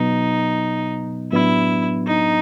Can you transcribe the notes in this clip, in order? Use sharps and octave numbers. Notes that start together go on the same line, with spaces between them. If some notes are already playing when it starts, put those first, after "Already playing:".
Already playing: B2 F#3 B3 D#4
A2 F#3 B3 D4 E4
D#4